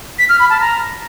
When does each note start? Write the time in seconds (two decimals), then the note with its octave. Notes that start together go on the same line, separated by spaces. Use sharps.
0.19 B6
0.29 F6
0.39 B5
0.50 A5
0.60 A#5